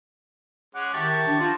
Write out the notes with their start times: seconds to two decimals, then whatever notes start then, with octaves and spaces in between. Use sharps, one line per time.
0.75 G#3 C#4 F#5 D6
0.94 D#3 E4 G4 A5 C#6
1.27 D4
1.39 F3 F#3 F4 F#4